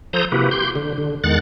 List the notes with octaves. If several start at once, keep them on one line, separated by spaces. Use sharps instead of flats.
F3 A4 C5 A#5 D#6 G6
C3 A#3 E4 F#4 G4 B4
G4 C6 G6
D3
D3
E2 D#3 G#3 F#5 F#6 A6